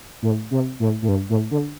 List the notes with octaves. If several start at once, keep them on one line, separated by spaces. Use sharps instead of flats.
A2
C3
A2
A2
G2
A2
D3